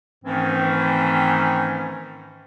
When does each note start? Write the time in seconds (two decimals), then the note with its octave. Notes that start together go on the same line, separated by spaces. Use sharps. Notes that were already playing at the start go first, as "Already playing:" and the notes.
0.24 G#2 D#3 E3 A3 C4 C#4